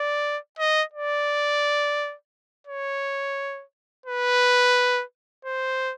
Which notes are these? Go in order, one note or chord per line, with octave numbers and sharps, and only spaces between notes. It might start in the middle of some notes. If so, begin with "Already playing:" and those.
Already playing: D5
D#5
D5
C#5
B4
C5